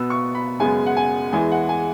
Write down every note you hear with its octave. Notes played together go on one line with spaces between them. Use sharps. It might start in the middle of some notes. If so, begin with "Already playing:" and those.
Already playing: B2 B3 E6
C#6
B5
F#2 C#3 G#3 B3 G#5
F#5
G#5
E2 E3 G#3 G#5
F#5
G#5